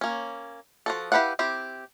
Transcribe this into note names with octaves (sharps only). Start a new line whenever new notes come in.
A#3 C#4
F3 F#4 A4
E4 G4 B4 F5 F#5
C4 E4 G4